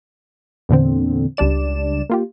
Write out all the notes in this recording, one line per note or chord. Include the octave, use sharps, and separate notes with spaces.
E2 A#2 D3 C4
C#2 G3 D4 D5 E7
A#3 F4 G4